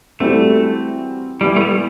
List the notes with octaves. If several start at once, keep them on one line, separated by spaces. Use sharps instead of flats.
E3 G3 A3 C4 F#4
E3 G3 B3 E4 G4
A3
G3